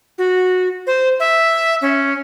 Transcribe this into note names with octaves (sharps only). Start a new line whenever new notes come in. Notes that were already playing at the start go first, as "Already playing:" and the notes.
F#4
C5
E5
C#4